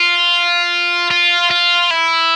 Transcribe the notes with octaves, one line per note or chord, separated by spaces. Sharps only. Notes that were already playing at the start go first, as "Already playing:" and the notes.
Already playing: F4
F4
F4
E4